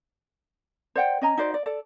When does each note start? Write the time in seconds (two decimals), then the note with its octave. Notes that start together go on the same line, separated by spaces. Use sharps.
0.96 C5 D5 F#5 G5
1.22 C#4 D#5 G#5 A#5
1.37 D#4 F#4 C5 D5
1.54 D5
1.66 A4 D5